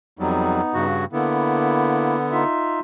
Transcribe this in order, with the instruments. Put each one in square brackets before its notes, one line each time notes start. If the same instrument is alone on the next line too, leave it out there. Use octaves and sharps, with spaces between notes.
[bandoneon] F2 F#3 G3 [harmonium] B3 D#4
[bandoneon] G2 C#3 F#4
[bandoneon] D3 B3 [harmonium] A#3 E4
[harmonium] D#4 F4 E5